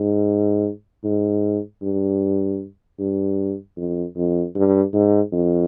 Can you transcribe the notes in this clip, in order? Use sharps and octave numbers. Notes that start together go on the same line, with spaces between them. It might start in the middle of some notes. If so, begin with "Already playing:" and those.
Already playing: G#2
G#2
G2
G2
F2
F2
G2
G#2
F2